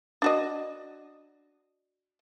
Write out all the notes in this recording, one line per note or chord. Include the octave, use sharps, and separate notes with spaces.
D4 F#4 D#5